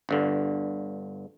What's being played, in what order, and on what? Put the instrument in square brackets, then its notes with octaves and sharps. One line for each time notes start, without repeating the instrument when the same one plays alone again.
[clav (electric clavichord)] G1 G2 D3